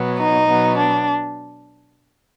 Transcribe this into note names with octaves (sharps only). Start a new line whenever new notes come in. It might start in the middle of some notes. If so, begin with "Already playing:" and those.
Already playing: B2 F#3 B3
D#4
B2 F#3 B3
D4